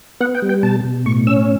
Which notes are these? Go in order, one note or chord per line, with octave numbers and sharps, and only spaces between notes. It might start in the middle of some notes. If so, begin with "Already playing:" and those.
B3 F#5
G5
G3
G5
B2 A5
B2
A2 C#6
C#4 E6